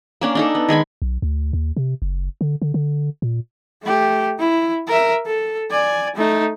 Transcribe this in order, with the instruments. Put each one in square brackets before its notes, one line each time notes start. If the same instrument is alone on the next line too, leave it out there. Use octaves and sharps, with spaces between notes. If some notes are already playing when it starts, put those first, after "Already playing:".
[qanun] A#3 C#4 D4
D4 D#4 A4
B3
D#3 G#3 G#5 B5
[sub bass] B1
D2
D#2
C3
F#1
D3
D3
D3
A#2
[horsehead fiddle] A3 G4
E4
A#4 E5
A4
D5 G#5
A3 D#4